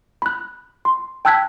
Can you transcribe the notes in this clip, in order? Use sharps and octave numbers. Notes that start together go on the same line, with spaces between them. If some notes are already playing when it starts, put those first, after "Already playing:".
B5 F#6
C6
G5 A5 E6 F#6 G#6 B6